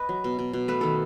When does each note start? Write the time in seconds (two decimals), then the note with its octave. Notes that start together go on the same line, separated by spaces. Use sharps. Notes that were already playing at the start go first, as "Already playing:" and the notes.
Already playing: B4 D#5
0.09 F#3
0.24 B2
0.39 B2
0.53 B2
0.68 A3 B4
0.81 D#3 A4